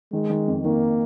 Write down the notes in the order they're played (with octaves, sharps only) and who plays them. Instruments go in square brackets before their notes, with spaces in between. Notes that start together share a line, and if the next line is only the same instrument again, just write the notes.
[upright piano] D#3 [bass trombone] G#3
[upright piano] D#3
F2
[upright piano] D#3 [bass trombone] A#3